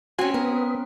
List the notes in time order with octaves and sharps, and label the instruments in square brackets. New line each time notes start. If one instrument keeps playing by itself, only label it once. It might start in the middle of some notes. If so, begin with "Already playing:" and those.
[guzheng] C4 C#4 [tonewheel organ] F#4 G#5
[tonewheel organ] B3 [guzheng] A#4